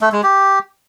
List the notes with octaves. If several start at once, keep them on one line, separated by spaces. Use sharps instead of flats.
A3
G#3
G4